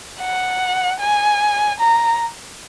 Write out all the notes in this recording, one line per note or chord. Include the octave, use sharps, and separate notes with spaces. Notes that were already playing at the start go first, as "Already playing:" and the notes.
F#5
G#5
A#5